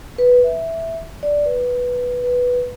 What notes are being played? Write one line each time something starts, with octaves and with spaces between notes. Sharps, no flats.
B4
E5
D5
B4
B4